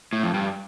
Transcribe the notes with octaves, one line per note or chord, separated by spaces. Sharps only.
A2
F2
G2